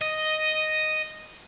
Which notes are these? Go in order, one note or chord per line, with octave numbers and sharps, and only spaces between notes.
D#5